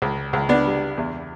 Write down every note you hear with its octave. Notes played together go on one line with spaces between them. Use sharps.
C#2
C#2
B3 D4
G3
E2